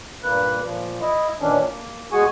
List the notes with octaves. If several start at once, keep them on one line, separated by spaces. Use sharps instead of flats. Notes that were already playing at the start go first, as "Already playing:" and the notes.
G2 A#2 A#3 B4 F#6
A#2 F3
E4 D#5
A#2 D#3 E3 C#4 D4
A#3
E2 G#3 F#4 G#4 G#5 C#6